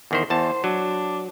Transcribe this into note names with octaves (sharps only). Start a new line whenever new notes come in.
E2 D#3 C5
E2 C5 A5
F#3 D4